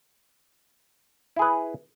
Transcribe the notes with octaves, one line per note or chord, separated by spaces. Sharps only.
E4 G#4 B4